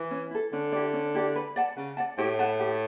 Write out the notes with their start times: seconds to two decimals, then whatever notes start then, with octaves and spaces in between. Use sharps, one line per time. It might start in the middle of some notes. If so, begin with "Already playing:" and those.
Already playing: E3
0.11 C#4
0.31 E4 A4
0.53 D3 C#4
0.72 E4 G4 D5
0.93 C#4
1.15 E4 G4 D5
1.36 B4
1.56 D5 F#5 A5
1.77 C#3 B4
1.97 D5 F#5 A5
2.18 A2 G4
2.39 B4 F#5 A5
2.60 G4